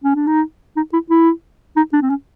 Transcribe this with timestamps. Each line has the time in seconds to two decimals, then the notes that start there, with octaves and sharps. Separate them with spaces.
0.04 C#4
0.15 D4
0.27 D#4
0.77 D#4
0.93 E4
1.10 E4
1.77 D#4
1.93 D4
2.02 C4
2.10 C#4